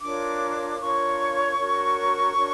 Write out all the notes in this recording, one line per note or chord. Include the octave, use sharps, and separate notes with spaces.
D4 F4 A#4 C#5 D6
D4 F4 A#4 C#5 C#6
D4 F#4 A#4 C#5
D4 F#4 A#4 C#5